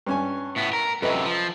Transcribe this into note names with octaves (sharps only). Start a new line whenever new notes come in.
G2 C#4 G#5
A2 B3
A#4
F#2 C3 A4 B4 D#5
F3